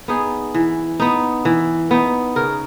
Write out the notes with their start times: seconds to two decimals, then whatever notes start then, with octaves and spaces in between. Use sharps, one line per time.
0.08 B3 D#4 G#4
0.54 E3
1.00 B3 D#4
1.45 E3
1.91 B3 D#4
2.36 C#3 A#4